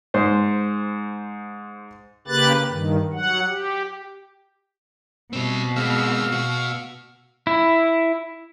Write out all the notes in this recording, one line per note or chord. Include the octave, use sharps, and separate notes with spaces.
G#2 C5
C#3 A#3 G4 B4 F#6 A6
G2 D#3
F#3 F#5
G4
B2 G3 C4
G#3 C4 F5 E6
B2 F#4
E4